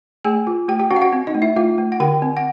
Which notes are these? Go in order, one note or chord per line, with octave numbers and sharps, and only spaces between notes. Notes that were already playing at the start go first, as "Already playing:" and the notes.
A3 G#4 G#5
F4
A3 G4 G5
G4 G5
C#4 F#4 F#5
F5
F#4 F#5
C4
D#4 D#5
A3
E4 E5
A3 F4 F5
A3
F#5
D3 G4 G5
C4
F#5